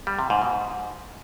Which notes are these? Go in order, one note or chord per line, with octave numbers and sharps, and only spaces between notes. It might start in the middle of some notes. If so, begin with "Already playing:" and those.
G3
C3
G#2
B2
G#2